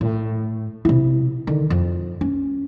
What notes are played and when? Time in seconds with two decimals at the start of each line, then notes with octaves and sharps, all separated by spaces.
0.01 A2
0.85 C3 E4
1.47 D3 D#3
1.70 F2
2.21 C#4